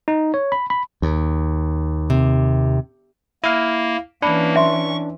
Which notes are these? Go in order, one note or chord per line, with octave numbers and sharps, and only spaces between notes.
D#4
C#5
B5
B5
D#2
C3
A#3 E4 F5
E3 A#3 C#4 D4 B5
E5 C6 C#6